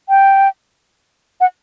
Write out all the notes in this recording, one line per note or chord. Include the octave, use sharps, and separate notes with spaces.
G5
F#5